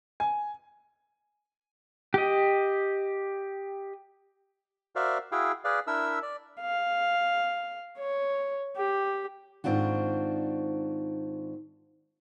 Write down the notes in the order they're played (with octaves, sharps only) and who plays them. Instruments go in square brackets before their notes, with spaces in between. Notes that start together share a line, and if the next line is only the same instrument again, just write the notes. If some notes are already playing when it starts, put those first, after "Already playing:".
[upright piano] G#5
[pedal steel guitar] G4 D#5
[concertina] F#4 A#4 C5 D5 E5 F5
E4 F#4 G#4 F5 G5
G#4 B4 D5 F5
D4 E4 A#4 E5 E6
D5
[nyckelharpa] F5
C#5
G4
[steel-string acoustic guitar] G#2 D#3 C4 D4 F4 F#4